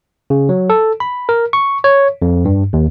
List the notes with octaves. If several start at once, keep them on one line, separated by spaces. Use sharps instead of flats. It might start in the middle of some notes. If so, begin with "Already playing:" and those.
C#3
F#3
A4
B5
A#4
C#6
C#5
F2
G2
D#2